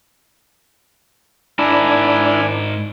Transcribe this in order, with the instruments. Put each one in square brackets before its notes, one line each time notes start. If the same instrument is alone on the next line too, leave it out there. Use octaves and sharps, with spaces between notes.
[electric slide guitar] G#2 A#4 A5 [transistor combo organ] D4 [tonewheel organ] E4 [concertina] G#5 B5